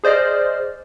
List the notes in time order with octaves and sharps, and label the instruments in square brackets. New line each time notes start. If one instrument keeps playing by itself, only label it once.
[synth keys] G#4 C5 D5 D#5 F6